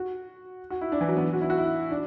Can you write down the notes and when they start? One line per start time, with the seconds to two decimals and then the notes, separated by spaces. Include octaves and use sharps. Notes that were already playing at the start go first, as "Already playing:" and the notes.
Already playing: F#4
0.70 F#4
0.81 E4
0.92 D4
1.01 E3
1.09 F#3
1.17 B3
1.33 F#4
1.41 E4
1.50 F#4
1.58 E4
1.91 D4